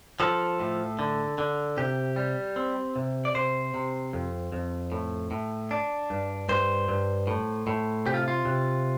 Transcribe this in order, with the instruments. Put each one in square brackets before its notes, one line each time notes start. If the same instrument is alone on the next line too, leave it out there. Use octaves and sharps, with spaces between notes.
[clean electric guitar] F3 A4
A2
D3
D3
C3 G4
G3
C4
C3
D5
C3 C5
C3
F2
F2
A2
A2
D4
G2
G2 C5
G2
A2
A2
C3 G4
F4
F4
C3